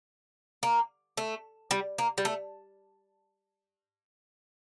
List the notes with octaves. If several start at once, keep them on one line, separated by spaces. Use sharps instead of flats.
A#3
A3
G3
A#3
G3
A3